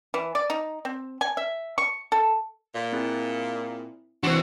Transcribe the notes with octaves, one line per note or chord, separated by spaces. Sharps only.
E3
D5
D#4
C4
G#5
E5
C#6
A4
A#2
C4 E4 G#4
E3 C4 D4 F#4 C5 C6